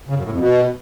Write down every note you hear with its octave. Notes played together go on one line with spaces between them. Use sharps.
C#3
F#2
A2
F2
B2